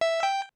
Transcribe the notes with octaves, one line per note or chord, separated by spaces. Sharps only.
E5
G5